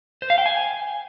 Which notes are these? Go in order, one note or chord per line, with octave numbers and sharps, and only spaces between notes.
C5
F5
G5
G#5